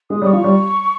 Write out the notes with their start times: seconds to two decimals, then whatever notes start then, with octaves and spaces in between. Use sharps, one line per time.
0.10 G#3 D#6
0.22 G3 D#6
0.26 C#6
0.33 F3
0.44 G3